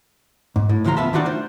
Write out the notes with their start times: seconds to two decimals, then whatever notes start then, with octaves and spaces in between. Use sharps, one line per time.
0.56 G#2
0.69 A2
0.84 C2 A2 D3 F3 F4 A#5
0.96 C#2 B3 E5 A5 B5
1.13 D#3 D4 D#4 F4 F#4 D5
1.26 A3 C5